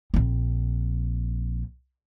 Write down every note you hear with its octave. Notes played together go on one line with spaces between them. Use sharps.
A#1 C4